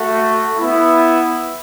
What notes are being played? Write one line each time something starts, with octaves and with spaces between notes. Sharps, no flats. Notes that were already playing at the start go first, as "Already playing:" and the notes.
Already playing: A3 F#4
B3 E4